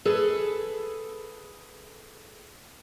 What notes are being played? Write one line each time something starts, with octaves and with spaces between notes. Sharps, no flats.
G#4 A4 B4